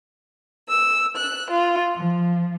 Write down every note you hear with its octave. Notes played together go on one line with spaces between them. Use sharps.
E6
F#6
F4
F3